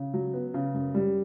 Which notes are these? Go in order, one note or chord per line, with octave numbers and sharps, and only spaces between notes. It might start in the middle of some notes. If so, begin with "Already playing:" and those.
Already playing: C#3
F#3
B3
C#3
F#2
G3